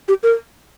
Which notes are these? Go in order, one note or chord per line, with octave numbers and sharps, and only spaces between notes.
G4
A#4